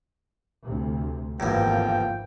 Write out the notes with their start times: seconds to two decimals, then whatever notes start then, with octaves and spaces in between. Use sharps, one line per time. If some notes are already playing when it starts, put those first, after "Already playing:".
0.64 D2 C3
1.40 G#1 E2 G2 D3 F3 A#3 G5